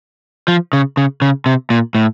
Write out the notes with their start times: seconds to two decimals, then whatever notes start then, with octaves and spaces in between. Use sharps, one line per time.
0.48 F3
0.73 C#3
0.97 C#3
1.22 C#3
1.46 C3
1.70 A#2
1.95 A2